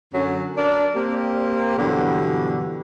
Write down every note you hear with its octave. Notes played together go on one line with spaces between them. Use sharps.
F#2 D3 F#3 C#4
D4 A#4 D5
A#3 C4 G4
G2 B2 D3 E3 F#3 B3